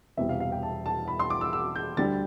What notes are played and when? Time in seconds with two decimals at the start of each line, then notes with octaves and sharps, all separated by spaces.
0.17 E1 E2 C3 G3 E5
0.29 F5
0.40 F5
0.52 G5
0.63 A5
0.86 A5
1.08 B5
1.19 C6
1.30 D6
1.41 E6
1.53 E6
1.76 G6
1.97 D2 D3 G3 A6